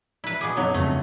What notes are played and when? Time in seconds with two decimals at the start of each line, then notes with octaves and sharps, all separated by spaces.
0.24 E4 B4
0.41 B2 G#4 D6
0.57 G1 F#3 D#4 C#5
0.74 F2 C#3 A3